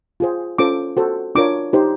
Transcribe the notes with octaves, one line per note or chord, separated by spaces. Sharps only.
F4 G#4 C5
C#4 F4 A4 C5 D6
F#4 A4 C5
D4 F4 A#4 C#5 D6
D#4 G4 C5